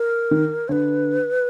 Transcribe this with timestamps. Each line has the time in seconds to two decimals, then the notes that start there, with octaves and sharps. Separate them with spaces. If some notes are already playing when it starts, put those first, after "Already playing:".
Already playing: A#4
0.31 D#3
0.68 D3 B4 C#5